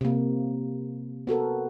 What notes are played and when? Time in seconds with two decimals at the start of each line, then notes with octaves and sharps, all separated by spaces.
0.01 C3 A#3
1.27 B3 F#4 A4 A#4